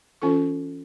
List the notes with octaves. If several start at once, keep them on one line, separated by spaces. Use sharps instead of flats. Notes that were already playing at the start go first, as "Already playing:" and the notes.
E3 C#4 F4 A4 C#6